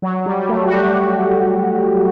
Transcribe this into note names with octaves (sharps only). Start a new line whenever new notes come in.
F#3
G3
G3
A3
F#4
G4